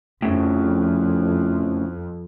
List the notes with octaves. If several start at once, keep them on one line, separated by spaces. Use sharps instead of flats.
F2 A2 C#3